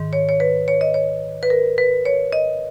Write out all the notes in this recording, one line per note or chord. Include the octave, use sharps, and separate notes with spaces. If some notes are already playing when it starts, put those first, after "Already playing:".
Already playing: G#2 D#3
C#5
C#5
B4
C#5
D#5
C#5
B4
A#4
B4
C#5
D#5